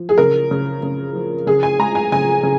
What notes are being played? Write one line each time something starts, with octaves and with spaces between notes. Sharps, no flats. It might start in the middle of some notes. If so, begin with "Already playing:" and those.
Already playing: F3
G#4
C#3 A#4
C#3
C#3
F3
C#3 G#4
G#5
G#3 A#5
G#5
C#3 G#5
C#3